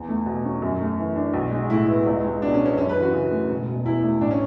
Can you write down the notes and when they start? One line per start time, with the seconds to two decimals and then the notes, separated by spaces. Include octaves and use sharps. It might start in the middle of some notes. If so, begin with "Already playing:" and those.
Already playing: E2
0.09 A3
0.26 B2
0.45 C#4
0.62 F#2
0.80 A3
0.98 E3
1.16 D4
1.34 B1
1.52 G#3
1.70 A2 E4
1.88 B3
2.06 C#2
2.24 G#3
2.42 B2 D4
2.54 C#4
2.60 B3
2.66 C#4
2.77 F#2 C#4
2.89 B4
2.96 E3
3.02 F#4
3.13 C#3
3.31 A3
3.49 E1
3.68 B2
3.85 E2 E4
4.04 A3
4.21 A1 D4
4.31 C#4